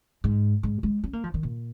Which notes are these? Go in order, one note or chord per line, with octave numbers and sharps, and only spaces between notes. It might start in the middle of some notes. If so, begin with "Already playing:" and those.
G#2
G#2
G#3
C#4
A#3
F3
D#3
A#2